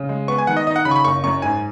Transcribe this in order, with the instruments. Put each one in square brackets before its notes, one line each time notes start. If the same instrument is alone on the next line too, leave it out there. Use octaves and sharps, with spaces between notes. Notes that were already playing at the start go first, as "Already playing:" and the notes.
Already playing: [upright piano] C#3
G#3
[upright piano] B3 [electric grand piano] C#6
[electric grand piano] G#5
[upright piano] D#3 [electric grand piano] F#5
[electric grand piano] D#5
[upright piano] D#4 [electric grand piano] D#5
[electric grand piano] F#5
[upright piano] C#3 [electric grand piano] B5
[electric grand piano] C#6
B5
[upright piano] F#1 [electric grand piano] C#6
[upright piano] F#2 [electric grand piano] C#6
[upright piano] G#2 [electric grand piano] G#5